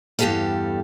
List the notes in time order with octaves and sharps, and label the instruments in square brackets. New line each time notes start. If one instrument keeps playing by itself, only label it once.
[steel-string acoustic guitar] E2 G2 G3 G4 A4 F5